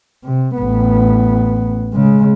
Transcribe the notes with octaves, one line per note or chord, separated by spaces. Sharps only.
C3
A1 B3
C#3 G#3